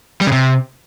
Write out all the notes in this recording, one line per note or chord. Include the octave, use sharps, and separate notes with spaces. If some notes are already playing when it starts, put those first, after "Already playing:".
G3
C#3
C3